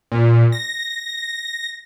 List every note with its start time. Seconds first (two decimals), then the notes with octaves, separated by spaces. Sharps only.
0.12 A#2
0.52 A#6